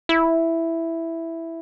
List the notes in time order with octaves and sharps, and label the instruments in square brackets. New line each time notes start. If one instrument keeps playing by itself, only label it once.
[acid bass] E4